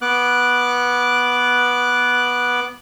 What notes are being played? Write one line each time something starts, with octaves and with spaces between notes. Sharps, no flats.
B3 D6 F#6